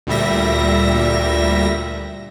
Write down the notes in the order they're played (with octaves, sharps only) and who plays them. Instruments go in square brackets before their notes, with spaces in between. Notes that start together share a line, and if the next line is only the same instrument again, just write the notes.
[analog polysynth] D2 A#2 G3 E5 A#6